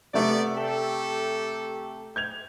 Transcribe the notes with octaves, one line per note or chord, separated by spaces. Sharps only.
C3 A3 B3 D5
G4 A4
G6 G#6 F7